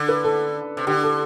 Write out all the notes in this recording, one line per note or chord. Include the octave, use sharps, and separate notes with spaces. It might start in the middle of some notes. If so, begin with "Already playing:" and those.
Already playing: D3
B4
A4
C3
D3 G4
A4